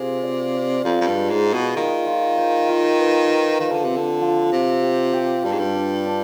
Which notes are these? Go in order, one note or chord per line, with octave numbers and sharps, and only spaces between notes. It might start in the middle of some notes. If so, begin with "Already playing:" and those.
Already playing: C3 F4 G#4
D5
D5
F2 F4
F2
G2
G#3
G#2
G#3
B2
D#3 F4
F4
C5
F4
B4
F4
D#3 F3
D3
C3
C4
D3
F3
C3 F3
G4
G4
G2 D4
G#2
G2
D4
D4